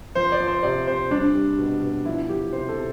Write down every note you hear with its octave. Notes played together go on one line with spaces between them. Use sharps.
F3 C5
D5
F3
C5
C3 D5
C3 C5
G3 D4
G3
B2
B2
F3 E4
F3 G4
C3 C5
A4
C3